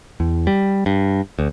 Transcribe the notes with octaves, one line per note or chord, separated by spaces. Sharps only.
E2
G3
G2
D2